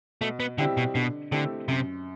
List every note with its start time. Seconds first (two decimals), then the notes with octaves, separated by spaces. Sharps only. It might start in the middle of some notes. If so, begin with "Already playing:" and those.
0.21 B2 A3
0.40 B3
0.58 D3 G3 C4 E4 G4
0.77 B2
0.95 B2 D3
1.32 D3 A3 C4 E4 G4
1.68 F#2 C3